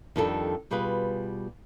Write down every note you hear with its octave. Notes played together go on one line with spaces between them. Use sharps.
F2 D#3 G3 D4 G#4 A4
B2 G3 F4 G#4 B4